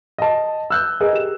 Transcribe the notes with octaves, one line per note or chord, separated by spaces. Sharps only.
D#5 A5
E6 F#6 G6
G#4 A#4 B4 D#5
G4 E7